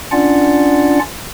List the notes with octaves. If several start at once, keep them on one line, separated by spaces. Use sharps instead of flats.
C#4 D4 F4 D5 F#5